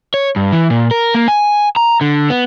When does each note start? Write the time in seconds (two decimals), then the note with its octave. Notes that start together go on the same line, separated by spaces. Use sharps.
0.14 C#5
0.36 G2
0.52 E3
0.70 A#2
0.91 A#4
1.15 A#3
1.28 G#5
1.76 A#5
2.01 D3
2.30 B3